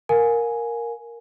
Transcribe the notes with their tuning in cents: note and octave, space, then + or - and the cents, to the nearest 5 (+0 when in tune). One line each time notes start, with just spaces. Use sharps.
A#4 +0 F5 +40 G#5 +0